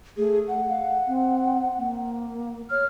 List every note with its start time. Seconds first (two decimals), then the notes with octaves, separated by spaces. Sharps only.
0.17 A3 G#4
0.48 F#5
0.70 F5
1.08 C4
1.78 A#3
2.71 C#5 F6